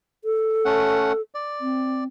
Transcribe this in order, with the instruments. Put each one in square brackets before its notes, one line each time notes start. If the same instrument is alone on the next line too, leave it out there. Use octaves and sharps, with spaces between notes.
[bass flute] A4
[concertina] A3 C#4 F#5
D5
[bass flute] C4